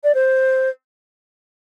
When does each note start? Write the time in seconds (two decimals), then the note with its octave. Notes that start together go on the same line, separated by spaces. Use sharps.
0.03 D5
0.14 C5